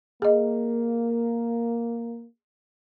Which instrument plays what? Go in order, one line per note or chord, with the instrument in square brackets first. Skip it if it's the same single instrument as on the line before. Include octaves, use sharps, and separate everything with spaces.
[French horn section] A#3 [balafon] G#4 D#5